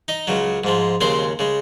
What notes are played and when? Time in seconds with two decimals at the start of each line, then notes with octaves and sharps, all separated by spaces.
0.08 D#4 D#5
0.27 C#2 C#3 F#3
0.64 G#2 F3 G#3
1.01 D#2 C#3 G#3 C4 C5
1.39 C#3 G#3